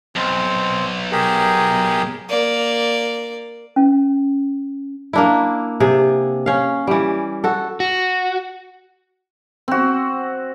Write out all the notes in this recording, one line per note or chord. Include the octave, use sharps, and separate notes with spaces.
B1 C4
G4 G#4 A#4
A#3 D5
C#4
A#3 D4 E4
C3 G#4
C#4 F5
E3 G3
F#4 A4
F#4
C4 F#4